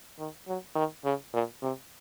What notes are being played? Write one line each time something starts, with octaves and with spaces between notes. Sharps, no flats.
D#3
F#3
D#3
C#3
A#2
C3